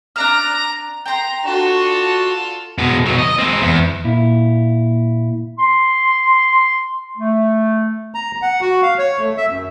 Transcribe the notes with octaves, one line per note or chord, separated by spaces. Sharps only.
D4 D5 A#5 F6
G5 A#5 C6
D4 F4 F#4 A4
B2 G#3
B2 F#3
D#5
G#3 C4
E2
A#2 E4
C6
A3
A#5
F#5
F#4
F5
C#5
A3
E5
F#2